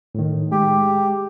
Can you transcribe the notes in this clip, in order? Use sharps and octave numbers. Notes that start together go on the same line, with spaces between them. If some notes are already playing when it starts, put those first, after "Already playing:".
A2 D#3
G#3 G4